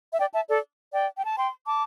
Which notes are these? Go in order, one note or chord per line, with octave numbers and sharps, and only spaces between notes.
E5
D5 G5
E5 A5
A4 D5
D5 G5
G5
A5
G5 C6
A5 D6